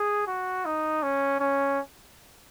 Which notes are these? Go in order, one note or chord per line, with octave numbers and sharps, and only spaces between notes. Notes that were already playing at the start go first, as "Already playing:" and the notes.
Already playing: G#4
F#4
D#4
C#4
C#4